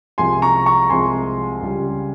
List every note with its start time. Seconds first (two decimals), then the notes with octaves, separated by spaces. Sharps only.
0.18 C2 C3 F3 G#3 G#5 C6
0.42 A#5 C#6
0.66 A#5 C#6
0.89 C2 C3 F3 G#3 G#5 C6
1.61 C#2 C#3 G3